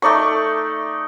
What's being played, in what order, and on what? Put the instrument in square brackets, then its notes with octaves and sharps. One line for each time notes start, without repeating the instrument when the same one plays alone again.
[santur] A3 D#4 D5 C#6